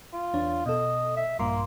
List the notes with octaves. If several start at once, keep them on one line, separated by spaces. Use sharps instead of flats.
F4
E2 D4 C#5
B2 A4 D#5
E5
A#1 G2 A#3 C6